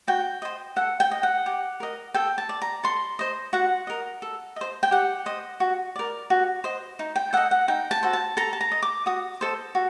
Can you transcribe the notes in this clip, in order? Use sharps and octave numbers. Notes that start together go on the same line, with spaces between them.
F#4 G5
C5 D#5
A4 F#5
G5
D#5
F#5
G4
A#4 D#5
A4 G5
A5
D5
A#5
A4 C6
C5 D#5
F#4 F#5
A#4 D#5
A4
C5 D#5
G5
G4 F#5
C5 D#5
F#4
A#4 D5
F#4
C5 D#5
D#4
G5
A4 D#5 F#5
F#5
D#4 G5
A5
F#4 A4 C5
A5
A4 A#5
A5
A#5
D#5
D6
F#4 D#6
A4 C5 D#5
F#4